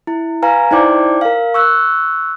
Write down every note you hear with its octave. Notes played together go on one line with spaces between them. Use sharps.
E4
B4 F5 G#5 A#5
D#4 E4 C5 D5 G5 D6
A#4 F5
C#6 E6 F#6